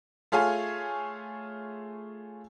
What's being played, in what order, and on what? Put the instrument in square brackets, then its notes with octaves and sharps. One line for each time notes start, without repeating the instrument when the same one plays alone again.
[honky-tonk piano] A3 F4 G#4 C#5 F5 G#5